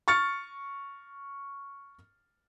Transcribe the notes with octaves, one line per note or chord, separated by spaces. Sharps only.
C#6 F6 A6 C#7